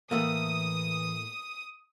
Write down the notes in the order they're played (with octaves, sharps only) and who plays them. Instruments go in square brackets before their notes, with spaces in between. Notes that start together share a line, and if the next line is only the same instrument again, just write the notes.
[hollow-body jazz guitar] A2 A3 A#3 [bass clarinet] E3 [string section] D#6